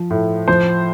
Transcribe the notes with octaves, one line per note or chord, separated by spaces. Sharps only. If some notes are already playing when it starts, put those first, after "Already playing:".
Already playing: F3
A2
F3 C5